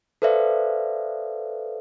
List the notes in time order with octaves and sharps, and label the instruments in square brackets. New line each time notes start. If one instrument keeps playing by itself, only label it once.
[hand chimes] A4 B4 C5 D5 E5 F5